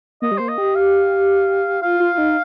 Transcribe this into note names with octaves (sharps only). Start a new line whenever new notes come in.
A#3 D#5
G3
A#3 C5
D#5
G4
F5
F4 F5
F4
D#4